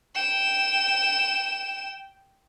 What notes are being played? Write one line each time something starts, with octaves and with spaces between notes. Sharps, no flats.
G5 E7